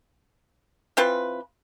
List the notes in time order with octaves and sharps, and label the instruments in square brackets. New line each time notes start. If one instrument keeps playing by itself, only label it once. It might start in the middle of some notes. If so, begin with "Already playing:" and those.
[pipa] E3 C4 F4 B4